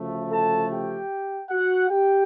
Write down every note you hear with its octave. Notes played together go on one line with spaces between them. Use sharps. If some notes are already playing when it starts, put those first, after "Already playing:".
Already playing: D2 C#3 F3 A3
A4 A5
G4 G5
F#4 F#5
G4 G5